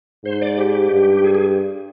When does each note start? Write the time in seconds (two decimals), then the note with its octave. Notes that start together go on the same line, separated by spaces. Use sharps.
0.25 G#2 C5
0.42 D5
0.58 G4
0.91 G2
1.24 G#4
1.35 G#4